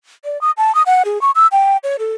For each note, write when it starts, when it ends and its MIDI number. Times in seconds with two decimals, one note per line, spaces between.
0.25 0.40 74
0.41 0.51 87
0.57 0.74 81
0.75 0.83 87
0.86 1.03 78
1.05 1.21 68
1.21 1.31 85
1.35 1.47 88
1.52 1.77 79
1.84 1.97 73
1.99 2.16 69